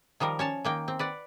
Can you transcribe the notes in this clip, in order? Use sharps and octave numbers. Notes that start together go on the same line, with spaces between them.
D#3 F3 G3 A#4
C#4 C#5 A5
D#3 A#3 G5
C4
B4 D5 F#5